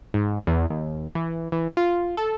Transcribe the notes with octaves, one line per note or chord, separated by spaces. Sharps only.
G#2
E2
D#2
E3
E3
F4
A4